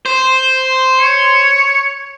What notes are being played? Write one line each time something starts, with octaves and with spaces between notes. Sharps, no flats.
C5
C#5